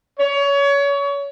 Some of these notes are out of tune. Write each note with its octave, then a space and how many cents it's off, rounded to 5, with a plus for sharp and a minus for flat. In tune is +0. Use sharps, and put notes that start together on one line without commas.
C#5 +25